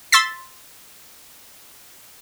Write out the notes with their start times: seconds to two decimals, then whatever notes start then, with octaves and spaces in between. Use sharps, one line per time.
0.12 C6 E6 A6 B6